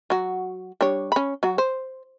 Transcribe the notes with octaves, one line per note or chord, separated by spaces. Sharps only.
F#3 F#4
G3 D4 C#5
C#4 B5
F#3 F#4
C5